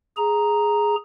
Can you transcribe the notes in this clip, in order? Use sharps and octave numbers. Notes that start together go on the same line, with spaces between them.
G#4 A#5